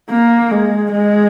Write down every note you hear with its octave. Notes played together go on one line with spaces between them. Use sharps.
A#3
G#3
G#3